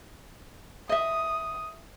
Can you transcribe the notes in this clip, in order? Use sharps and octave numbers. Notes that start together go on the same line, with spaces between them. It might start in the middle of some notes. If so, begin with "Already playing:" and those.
D#5 E5 D#6